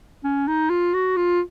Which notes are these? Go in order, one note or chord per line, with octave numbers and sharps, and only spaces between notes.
C#4
D#4
F4
F#4
F4